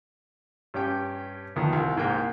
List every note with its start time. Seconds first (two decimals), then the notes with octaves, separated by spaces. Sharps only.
0.74 G2 C#4 G4 G5
1.56 D2 D#3 F3 B3
1.73 C2
1.96 C2 G#2 A#3 G5